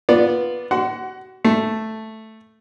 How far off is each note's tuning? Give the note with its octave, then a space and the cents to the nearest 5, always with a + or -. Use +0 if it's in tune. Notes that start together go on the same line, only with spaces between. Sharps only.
B3 -10 F4 +0 D5 +0
F#4 +30 F#5 +15 C6 -20
A3 +0 A5 +0